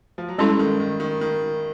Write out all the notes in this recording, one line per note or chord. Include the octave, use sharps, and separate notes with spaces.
F3
F#3
G2 G3 G#3 C#4 E4 A4
D#3
D#3
D#3
D#3